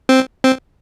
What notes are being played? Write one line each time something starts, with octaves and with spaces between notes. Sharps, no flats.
C4
C4